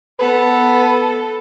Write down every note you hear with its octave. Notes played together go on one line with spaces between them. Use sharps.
B3 A4 B4